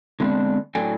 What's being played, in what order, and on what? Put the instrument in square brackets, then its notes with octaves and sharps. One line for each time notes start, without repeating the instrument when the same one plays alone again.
[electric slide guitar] D3 G#3 B3 C4 D4
A2 F#3 D4 A4 G5 G#5